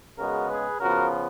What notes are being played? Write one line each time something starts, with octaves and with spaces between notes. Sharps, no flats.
C#3 G#3 B3 F#4 A#4
G#4 B4
C#3 F3 B3 F#4 A#4